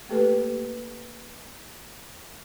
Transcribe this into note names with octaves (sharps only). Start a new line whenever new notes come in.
A3 A#3 G4 A4 B4